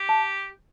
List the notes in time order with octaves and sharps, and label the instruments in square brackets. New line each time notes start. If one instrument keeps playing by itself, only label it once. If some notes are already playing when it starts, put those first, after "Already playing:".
Already playing: [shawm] G4
[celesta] A5